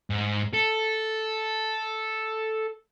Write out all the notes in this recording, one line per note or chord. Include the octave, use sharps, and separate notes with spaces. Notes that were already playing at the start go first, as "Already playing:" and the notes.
G#2
A4